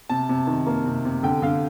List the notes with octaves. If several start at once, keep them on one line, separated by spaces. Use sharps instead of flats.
C3 A5
C3
D#3
A#3
C3
C3
D3 G5
D3 F5